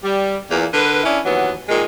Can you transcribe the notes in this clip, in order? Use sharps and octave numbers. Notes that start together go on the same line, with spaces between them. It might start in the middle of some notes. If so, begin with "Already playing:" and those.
G3
E2 A#2
D3 A#4 B4
C#4 D4 E4
D#2 E3 F#3 B3
A#2 D#3 G#3